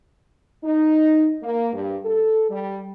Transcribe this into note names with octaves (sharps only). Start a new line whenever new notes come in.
D#4
A#3
G2
A4
G3